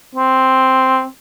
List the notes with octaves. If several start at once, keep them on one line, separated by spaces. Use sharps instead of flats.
C4